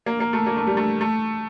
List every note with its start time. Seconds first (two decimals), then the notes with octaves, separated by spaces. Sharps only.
0.06 A#3
0.20 A#3
0.33 A3
0.47 A#3
0.57 A3
0.67 G3
0.77 A3
1.01 A3